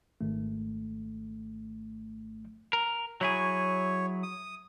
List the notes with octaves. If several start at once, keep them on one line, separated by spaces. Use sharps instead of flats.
G#1 A3
A#4
F#3 E4 G#4 C#5
D#6